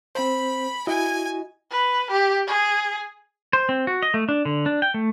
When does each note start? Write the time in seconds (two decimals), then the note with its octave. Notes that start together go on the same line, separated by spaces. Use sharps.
0.15 C4 C5 B5
0.87 E4 F#4 D#5 G#5
1.71 B4
2.11 G4
2.47 G#4
3.53 C5
3.69 C4
3.87 F#4
4.03 D#5
4.14 A3
4.29 D4
4.45 D3
4.66 D4
4.82 G5
4.94 A3